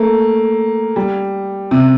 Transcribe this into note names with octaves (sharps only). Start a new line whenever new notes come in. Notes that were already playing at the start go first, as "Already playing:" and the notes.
Already playing: A3 A#3
G3
C3